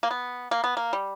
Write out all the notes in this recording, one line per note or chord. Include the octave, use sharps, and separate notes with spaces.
A#3
B3
A#3
B3
A#3
G3